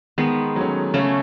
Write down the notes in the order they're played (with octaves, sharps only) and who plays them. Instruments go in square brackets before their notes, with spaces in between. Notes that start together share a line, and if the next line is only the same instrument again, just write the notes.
[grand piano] D#3 [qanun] G#3 B3
[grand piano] F#3 A3 C#4
[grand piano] C#3 [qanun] A3 C#4